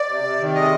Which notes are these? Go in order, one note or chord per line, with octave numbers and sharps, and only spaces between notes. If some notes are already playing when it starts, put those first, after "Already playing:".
Already playing: D5
C3
C3
D#3
G#3 D#5